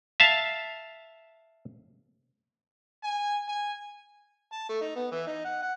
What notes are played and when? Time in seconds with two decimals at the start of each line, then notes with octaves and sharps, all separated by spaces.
0.20 E5 F5 A5
3.03 G#5
3.48 G#5
4.53 A5
4.69 A3
4.81 D#4
4.96 B3
5.12 E3
5.27 D#4
5.45 F#5
5.62 F#5